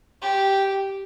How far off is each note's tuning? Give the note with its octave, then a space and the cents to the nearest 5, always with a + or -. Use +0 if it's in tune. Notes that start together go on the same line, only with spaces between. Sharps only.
G4 -5